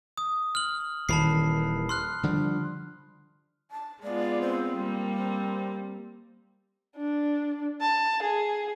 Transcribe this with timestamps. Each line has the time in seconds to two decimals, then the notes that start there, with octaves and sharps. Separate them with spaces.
0.17 D#6
0.55 F6 F#7
1.09 D#1 D#3 E3 A5 B5 C7
1.89 C6 F6 F#6
2.23 D3 F3 G3
3.71 A5
4.03 G#3 B3 F4 D5
4.41 C4
4.76 G3 A#3
5.15 C4
6.96 D4
7.81 A5
8.22 G#4